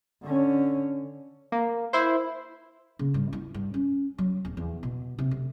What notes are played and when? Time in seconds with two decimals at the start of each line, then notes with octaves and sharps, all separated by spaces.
0.23 D3 C#4
1.52 A#3
1.93 E4 C5
2.99 C#3
3.14 G2
3.33 E4
3.54 G2
3.74 C#4
4.18 F#3
4.45 D1
4.57 E2
4.83 B2
5.19 C3
5.31 D2